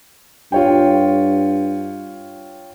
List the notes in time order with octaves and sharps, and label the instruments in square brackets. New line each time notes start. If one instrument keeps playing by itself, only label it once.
[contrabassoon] G2 [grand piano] F4 C#5 G5